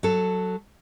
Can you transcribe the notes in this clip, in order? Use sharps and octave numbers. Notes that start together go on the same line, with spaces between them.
F#3 A4